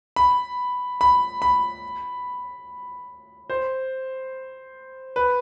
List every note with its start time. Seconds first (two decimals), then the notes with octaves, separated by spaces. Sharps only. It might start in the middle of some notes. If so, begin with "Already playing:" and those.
0.16 B5
1.01 B5
1.42 B5
3.50 C5
5.16 B4